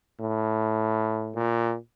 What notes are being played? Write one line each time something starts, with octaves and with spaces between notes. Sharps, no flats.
A2
A#2